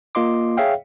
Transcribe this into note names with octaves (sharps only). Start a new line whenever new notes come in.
A#3 F4 D#5 C6 D6
G#4 C#5 E5 F5 G5